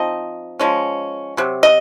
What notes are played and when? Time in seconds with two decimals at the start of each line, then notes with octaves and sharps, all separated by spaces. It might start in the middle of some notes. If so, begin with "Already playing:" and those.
Already playing: F3 C4 D#4 D#5
0.59 F3 G#3 C#4
1.37 C3 F#3
1.63 D#5